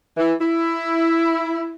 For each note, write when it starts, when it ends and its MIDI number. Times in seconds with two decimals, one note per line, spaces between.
0.17 0.33 52
0.41 1.76 64